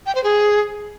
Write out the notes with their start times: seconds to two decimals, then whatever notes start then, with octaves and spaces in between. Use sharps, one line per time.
0.06 G5
0.15 C5
0.24 G#4